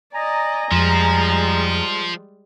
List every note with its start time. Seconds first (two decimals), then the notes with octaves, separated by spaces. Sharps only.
0.13 D5 D#5 G#5 A#5
0.72 F2 F3 G3 G#3